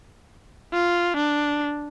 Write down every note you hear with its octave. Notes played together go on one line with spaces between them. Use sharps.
F4
D4